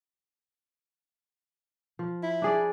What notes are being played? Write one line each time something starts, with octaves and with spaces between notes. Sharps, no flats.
F3
E4
D4 G#4 D5